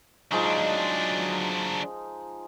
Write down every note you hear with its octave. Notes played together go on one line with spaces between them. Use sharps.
F3 F#3 G#3 D4 D#4